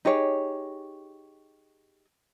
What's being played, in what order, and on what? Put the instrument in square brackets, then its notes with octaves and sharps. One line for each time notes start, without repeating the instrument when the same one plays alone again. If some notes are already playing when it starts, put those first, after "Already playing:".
[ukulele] D#4 G4 G#4 C#5